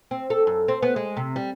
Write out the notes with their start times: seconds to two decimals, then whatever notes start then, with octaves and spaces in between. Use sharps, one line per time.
0.11 C4
0.30 A4
0.47 F#2
0.68 C4
0.82 B3
0.96 G#3
1.17 C3
1.36 G3